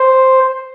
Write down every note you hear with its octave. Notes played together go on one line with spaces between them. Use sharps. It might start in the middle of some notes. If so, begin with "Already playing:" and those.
Already playing: C5